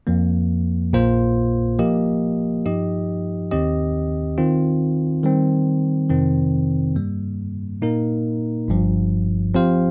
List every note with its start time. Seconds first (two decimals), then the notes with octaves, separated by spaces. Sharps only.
0.07 F2 F3 A#3
0.93 A#1 A#2 A#3 F4 C5
1.79 F3 A#3 G4 D#5
2.65 G2 F3 D#4 G4 D#5
3.51 D#2 D#3 C4 G4 D#5
4.38 D#3 C4 F4
5.24 D#3 G3 C4
6.10 F2 C3 D#3 C4
6.96 G2 G3 A#3
7.82 A#2 A#3 D#4 A#4
8.68 G1 G2 F3
9.54 F3 C4 G4 C5 F5